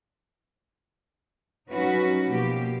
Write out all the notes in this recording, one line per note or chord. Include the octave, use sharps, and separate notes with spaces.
F#3 C#4 D#4 F#4 B4
B2 F3 A#3 G4